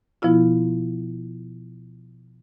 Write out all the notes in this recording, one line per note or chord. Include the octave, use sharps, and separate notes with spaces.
B2 F3 B3 E4 F4